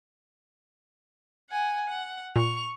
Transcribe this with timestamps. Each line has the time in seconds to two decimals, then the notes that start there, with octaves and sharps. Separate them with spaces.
1.50 F#5 G#5
1.87 F#5
2.36 A#2 C#6 F7